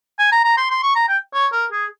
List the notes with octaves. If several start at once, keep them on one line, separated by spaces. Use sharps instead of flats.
G#5
A#5
A#5
C6
C6
C#6
A#5
G5
C#5
A#4
G#4